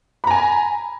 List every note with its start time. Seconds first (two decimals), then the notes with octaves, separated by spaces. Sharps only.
0.24 B5
0.27 A#5
0.31 G#5